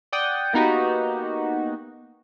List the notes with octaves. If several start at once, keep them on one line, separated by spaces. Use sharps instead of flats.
D5 F#5 G5 D#6
A#3 B3 D#4 F#4 G4